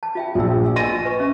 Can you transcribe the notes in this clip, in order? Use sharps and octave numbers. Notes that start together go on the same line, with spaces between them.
A5
F4 E5 G5
A#1 G5 E6
D#5 G#5 A#6 D#7
B4 C#6
C#4 E5